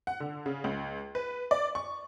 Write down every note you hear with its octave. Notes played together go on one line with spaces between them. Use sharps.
F#5
D3
C#3
C#2
B4
D5
C#6